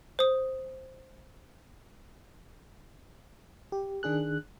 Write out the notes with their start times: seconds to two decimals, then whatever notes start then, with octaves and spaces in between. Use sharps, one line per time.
0.19 C5 D#6
3.72 G4
4.03 D#3 D4 G#4 F#6